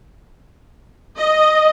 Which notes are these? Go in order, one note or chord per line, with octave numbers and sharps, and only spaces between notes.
D#5